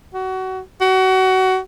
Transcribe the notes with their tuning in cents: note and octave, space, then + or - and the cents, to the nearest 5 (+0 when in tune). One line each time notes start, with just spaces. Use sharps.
F#4 +25
F#4 +25